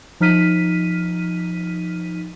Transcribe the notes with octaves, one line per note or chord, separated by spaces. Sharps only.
F3 D#4 F6 B6 D#7